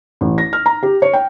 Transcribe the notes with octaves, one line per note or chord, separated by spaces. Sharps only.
A1
A#6
F6
A#5
G4
C#5
G5